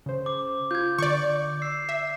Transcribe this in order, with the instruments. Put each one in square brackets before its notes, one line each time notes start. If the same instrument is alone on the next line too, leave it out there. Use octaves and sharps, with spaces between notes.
[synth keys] C#3 C5
[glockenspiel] D6
[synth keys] F4 [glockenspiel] G6 G#6
[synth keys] D3 [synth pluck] D5 C#6
[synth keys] E6 [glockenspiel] C7
[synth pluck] E5